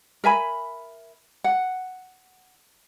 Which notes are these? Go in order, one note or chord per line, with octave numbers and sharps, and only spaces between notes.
A#4 E5 G#5 B5
F#5